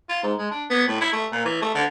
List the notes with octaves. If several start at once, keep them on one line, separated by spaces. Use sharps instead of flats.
F4
G#2
G#3
D4
B3
A2
E4
A3
A#2
E3
A3
D3